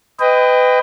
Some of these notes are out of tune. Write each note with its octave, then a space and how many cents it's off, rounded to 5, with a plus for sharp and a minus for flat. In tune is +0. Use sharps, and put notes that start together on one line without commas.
B4 +30 D#5 +0 G5 +20